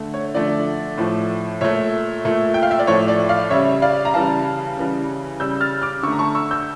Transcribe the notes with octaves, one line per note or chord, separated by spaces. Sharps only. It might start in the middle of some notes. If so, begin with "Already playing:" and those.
Already playing: D3 A3
C#5
D3 F3 A3 D5
A2 F3 A3
A#2 A3 C#5 E5
A#2 A3
G5
F5
E5
D5
A2 F3 A3 C#5
D5
D5 F5
C#3 G3 C#5 E5
D5 F5
A#5
C#3 E3 G3 F5 A5
C#3 E3 G3
C#3 G3 E6 G6
F6 A6
D6 F6
D3 A3 C#6 E6
A#5
A5 C#6
C#6 E6
E6 G6